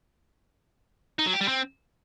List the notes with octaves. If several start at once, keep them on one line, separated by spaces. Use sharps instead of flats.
D#4
F#3
G4
G3
C4